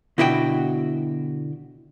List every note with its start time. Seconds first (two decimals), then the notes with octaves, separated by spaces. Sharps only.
0.18 B2 D3 E4 F#4 A4 G5